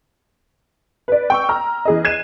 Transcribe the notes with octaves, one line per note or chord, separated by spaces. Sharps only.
B4 D5
G5 C#6 E6
A#5 F6
E3 G#4 D#5
F#6 G#6 C7 D#7 E7